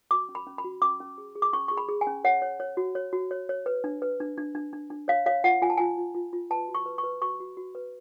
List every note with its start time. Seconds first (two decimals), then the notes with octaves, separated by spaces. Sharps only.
0.11 F#4 D6
0.29 C#4
0.35 B5
0.47 C#4
0.58 B5
0.64 F#4
0.82 C#4 D6
1.00 C#4
1.18 G#4
1.35 G#4
1.42 D6
1.53 C#4 C#6
1.68 G#4 C#6
1.77 B5
1.88 G#4
2.01 G#5
2.07 C#4
2.24 C#5 F#5
2.42 C#5
2.60 C#5
2.77 F#4
2.95 C#5
3.13 F#4
3.31 C#5
3.49 C#5
3.66 B4
3.84 D4
4.02 B4
4.20 D4
4.38 D4
4.55 D4
4.73 D4
4.90 D4
5.08 C#5 F5
5.26 C#5 F5
5.44 F4 F#5
5.62 F4 G#5
5.70 A5
5.77 F4 G#5
5.98 F4
6.15 F4
6.33 F4
6.50 B4 A5
6.68 F#4
6.75 C#6
6.86 B4
6.98 C#6
7.04 B4
7.22 F#4 C#6
7.40 F#4
7.57 F#4
7.75 B4